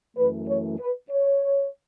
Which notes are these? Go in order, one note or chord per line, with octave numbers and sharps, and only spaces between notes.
F#2 E3 A3 B4
C#5
B4
C#5